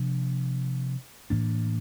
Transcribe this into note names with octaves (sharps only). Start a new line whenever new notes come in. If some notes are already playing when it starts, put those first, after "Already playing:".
Already playing: C3 F3 A#3 D4
A2 E3 A#3 D4